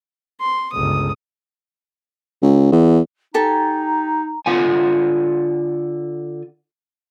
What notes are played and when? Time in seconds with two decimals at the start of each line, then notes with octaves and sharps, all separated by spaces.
0.41 C6
0.73 G1 C#2 D#6
2.42 C#2
2.72 E2
3.34 D#4 G4 A4 G#5 A#5
4.46 D3 F4 F#5 G#5